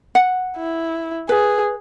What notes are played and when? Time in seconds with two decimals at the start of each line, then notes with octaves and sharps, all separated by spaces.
0.15 F#5
0.57 E4
1.29 G#4 B4